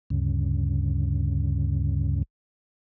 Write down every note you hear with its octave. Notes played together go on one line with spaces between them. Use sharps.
D2 G2 C#3